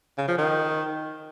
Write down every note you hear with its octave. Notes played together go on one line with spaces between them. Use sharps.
C#3
F3
D#3